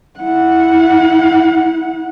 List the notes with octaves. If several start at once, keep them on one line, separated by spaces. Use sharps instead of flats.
E4 F#5